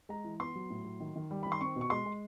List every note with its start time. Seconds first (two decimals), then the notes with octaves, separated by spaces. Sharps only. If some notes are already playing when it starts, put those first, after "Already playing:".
0.09 G#3 A#5
0.24 E3
0.40 B3 C6
0.56 F#3
0.70 A2
0.85 F#3
1.00 D#3
1.16 D#3
1.31 G3
1.43 D#3 B5
1.52 C6
1.61 C4 C#6
1.76 B2
1.81 C#6
1.90 G#3 C6
2.06 G#3